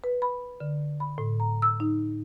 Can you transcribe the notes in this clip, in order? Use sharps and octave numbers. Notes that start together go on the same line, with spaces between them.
B4
B5
D3
B5
A2
A#5
E6
D#4